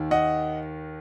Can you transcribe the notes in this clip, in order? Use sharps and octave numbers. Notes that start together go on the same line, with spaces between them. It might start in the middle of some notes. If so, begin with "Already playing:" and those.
Already playing: D#2 D#3
D#5 F#5